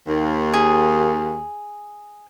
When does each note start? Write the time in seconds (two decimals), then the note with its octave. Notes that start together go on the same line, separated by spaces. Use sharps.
0.07 D#2
0.54 G#4